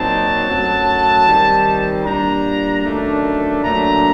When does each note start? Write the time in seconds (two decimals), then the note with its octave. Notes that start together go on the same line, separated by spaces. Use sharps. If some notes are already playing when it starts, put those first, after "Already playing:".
Already playing: A#2 F#3 C4 D#4 A5
0.47 F#2 F#3 A3
1.27 D#3 G3 C4 D#4
2.05 A#2 G3 D4 A#5
2.84 F#2 D#3 A3 D4
3.61 A#2 F#3 A3 D4 A#5